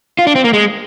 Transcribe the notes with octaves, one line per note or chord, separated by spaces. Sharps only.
F4
D4
C4
A#3
G#3